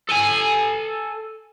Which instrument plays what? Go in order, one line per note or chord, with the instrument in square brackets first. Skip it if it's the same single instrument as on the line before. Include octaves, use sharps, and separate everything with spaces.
[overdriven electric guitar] A4 G#5